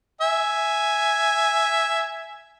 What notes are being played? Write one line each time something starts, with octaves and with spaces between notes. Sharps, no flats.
E5 G#5